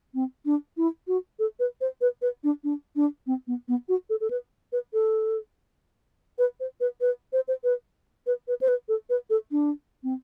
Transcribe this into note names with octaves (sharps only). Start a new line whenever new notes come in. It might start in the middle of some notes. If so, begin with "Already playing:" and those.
C4
D4
E4
F#4
A4
B4
C5
B4
B4
D4
D4
D4
C4
B3
B3
F#4
A4
A4
B4
B4
A4
B4
C5
B4
B4
C5
C5
B4
B4
B4
C5
B4
A4
B4
A4
D4
C4